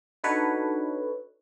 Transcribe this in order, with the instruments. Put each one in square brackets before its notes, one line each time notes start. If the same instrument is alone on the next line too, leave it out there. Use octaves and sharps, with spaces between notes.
[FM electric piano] D4 D#4 F#4 A4 B4 C#5